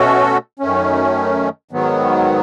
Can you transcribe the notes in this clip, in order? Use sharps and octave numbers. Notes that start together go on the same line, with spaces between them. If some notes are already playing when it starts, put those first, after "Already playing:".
Already playing: B2 A3 C#4 F#4 A4
F#2 D#3 A3 C#4
G#2 D#3 F#3 B3